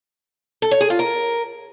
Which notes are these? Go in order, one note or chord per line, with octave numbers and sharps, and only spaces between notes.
A4
C#5
G#4
F4
A#4